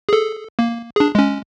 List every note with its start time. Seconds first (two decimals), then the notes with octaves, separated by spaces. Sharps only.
0.09 G#4 A4
0.59 A#3
0.96 D4 G#4
1.15 G#3 C#4